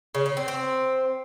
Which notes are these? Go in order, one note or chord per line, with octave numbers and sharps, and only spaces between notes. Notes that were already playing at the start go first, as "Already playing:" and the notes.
C#3
C#4
C4
C4